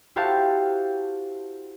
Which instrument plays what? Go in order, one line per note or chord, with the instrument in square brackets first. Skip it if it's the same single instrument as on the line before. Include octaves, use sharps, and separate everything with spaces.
[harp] E4 F#4 G4 C5 F5 A5